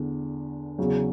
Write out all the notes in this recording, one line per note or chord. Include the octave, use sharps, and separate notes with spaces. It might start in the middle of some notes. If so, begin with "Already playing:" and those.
Already playing: E2 D3 B3
E2 C#3 F#3